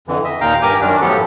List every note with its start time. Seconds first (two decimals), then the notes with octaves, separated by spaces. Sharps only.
0.08 F2 D3 E3
0.25 D#5 E5
0.41 D#2 A#2 D#4 F5 G5 A#5
0.62 G2 G4 A#4 G#5 A#5 D6
0.80 F#2 D#3 C#4 D4
1.01 A2 F3 F#3 B3 G4 A4